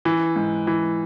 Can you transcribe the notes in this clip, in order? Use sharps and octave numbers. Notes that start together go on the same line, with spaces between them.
E3
G#2
E3